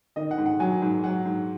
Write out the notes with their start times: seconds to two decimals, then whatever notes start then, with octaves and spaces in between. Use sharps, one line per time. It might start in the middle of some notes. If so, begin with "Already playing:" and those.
0.16 D#3 D#5
0.31 F#5
0.38 G#2
0.46 F#5
0.60 F#3 G#5
0.82 G#2
1.04 F#3 F#5
1.25 G#2